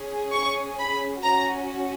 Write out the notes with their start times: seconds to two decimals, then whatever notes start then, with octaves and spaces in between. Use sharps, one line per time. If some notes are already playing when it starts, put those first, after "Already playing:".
Already playing: C#4 G#4
0.32 C#6
0.78 B5
1.23 C#4 F#4 A#5